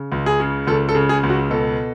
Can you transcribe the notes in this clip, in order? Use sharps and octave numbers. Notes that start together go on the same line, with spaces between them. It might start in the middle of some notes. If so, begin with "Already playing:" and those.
Already playing: C#3
C#2
G#4
C#3
C#2 A4
A4
C#3
G#4
C#2
F#4
B2 A4